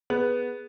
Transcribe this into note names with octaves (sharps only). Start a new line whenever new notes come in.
B3 G#4